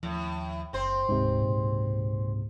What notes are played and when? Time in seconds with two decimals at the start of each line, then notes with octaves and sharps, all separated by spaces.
0.03 D#2 A2 F3
0.73 F#1 C4 C5
1.09 D1 G#2 C3
1.41 C#2 A#2